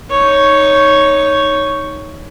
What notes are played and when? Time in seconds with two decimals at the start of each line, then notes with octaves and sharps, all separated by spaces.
0.11 D#4 C#5